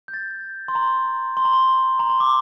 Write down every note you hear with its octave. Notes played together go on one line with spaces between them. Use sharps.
G6
A6
C6
A#5
C6
A#5
C6
A#5
C6
D6